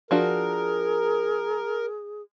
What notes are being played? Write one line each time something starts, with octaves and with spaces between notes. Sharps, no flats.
F3 D4 F#4 G#4 A#4